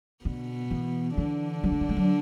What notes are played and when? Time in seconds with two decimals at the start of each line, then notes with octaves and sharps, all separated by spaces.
0.25 B2 D3 B3
0.71 E3
1.17 D3 E3 D4
1.64 F#3
1.72 G#3
1.81 F#3
1.89 G#3
1.97 F#3